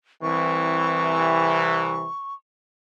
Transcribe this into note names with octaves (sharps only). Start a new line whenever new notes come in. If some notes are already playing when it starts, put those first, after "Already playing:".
C2 C3 E3 C#6